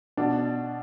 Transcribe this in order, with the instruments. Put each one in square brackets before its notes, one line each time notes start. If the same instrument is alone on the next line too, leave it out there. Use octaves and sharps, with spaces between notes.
[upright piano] B2 D4